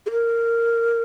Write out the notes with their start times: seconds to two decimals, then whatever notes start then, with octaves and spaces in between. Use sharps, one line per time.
0.06 G#4
0.11 A#4